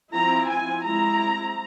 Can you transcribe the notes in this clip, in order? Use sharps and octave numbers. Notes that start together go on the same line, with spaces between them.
F3 C4 E4 A#5
G#5
G#3 C4 E4 A#5